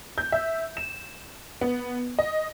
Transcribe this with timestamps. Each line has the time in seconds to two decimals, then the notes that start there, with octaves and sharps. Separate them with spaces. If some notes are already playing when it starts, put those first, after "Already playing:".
0.18 G6
0.32 E5
0.77 E7
1.61 B3
2.19 D#5